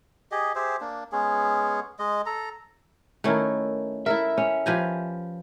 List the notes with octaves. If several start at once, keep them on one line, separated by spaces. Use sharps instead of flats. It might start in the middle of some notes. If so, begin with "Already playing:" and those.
G4 G#4 D#5
G4 G#4 C5 E5
A#3 D4
G#3 B3 C#4 G#4
G#3 D#5
A4 A#5
D#3 A3 C#4 E4 A#4
E4 A4 A#4 E5
C#4
F3 G4 B4 G#5 A#5